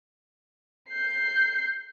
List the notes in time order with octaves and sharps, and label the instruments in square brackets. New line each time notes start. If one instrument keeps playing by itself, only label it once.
[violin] G6 C7